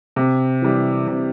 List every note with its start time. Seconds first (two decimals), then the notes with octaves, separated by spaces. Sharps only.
0.16 C3
0.62 E3 G3
1.07 C3